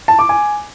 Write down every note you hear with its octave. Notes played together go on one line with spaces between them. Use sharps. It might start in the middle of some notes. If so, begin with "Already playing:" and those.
A5
D6
G#5